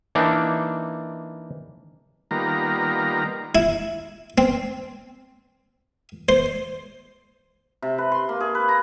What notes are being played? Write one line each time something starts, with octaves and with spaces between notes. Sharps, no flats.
E3 A#3 D4 D#4
D#3 G3 A#3 B3 F4 A#5
E4
C4
C5
C3
B4
C6
A#3
G#4
B4
A#5